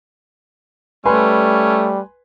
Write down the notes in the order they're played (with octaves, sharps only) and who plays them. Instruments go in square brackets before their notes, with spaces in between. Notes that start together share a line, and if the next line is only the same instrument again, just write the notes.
[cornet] G3 [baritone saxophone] A3 [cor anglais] C#4 [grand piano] B4 G#5 C6